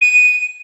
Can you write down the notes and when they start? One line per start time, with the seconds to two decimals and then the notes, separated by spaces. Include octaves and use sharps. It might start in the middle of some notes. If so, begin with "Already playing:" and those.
0.01 D#7